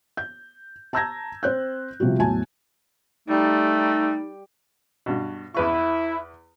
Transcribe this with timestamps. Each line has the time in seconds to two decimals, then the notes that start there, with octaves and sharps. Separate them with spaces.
0.17 G6
0.93 A5 A#5 E6 G6 G#6 A#6
1.43 C4 C5 F#6 G6
2.00 C3 F3 G3 F#4
2.18 E2 A2 F#3 G#5 A5
3.28 G3 A3 D#4
5.06 G2 B2
5.55 E2 E4 B4 C#6